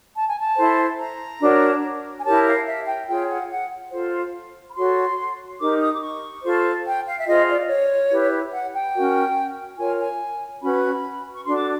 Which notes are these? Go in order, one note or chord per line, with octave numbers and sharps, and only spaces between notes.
A5
G#5
A5
E4 A4 C5
A#5
D4 F#4 A#4 C#5
G#5
E4 G4 A#4 C#5 A5
F5
E5
G5
F4 G#4 C#5 G5
F#5
F#5
F4 A4 C5
B5
F#4 A4 C#5 C6
D#4 G4 A#4 D6
D#6
D6
C#6
F4 A4 C5
G5
F5
E5
F4 G#4 C5 D#5
D5
C#5
E4 G4 B4
F#5
G5
C#4 F#4 A#4
F4 A#4 C#5 G#5
G#5
C#4 F#4 B4 B5
C#6
D4 F#4 A4 C6
D6